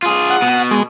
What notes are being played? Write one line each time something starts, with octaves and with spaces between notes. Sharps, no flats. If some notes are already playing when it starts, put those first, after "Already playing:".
F4 G#4
F#5
B2
G#3